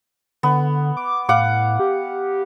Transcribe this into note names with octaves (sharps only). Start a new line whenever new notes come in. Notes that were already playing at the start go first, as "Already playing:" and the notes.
D3 B3
D6
A2 F5 F#5 D6
G4